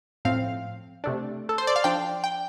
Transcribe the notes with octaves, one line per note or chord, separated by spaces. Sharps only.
A2 F3 C4 F5
C3 A3 D4
A4
C5
D5
F5
F3 D4 G5
G5